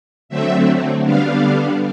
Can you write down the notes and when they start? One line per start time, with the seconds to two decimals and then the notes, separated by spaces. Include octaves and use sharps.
0.29 D3 F#3 A3 C4 E5
1.04 D3 G3 B3 D4 F5